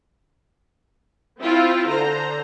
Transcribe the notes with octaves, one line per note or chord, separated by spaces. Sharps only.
C4 E4 F4
D3 C5 A#5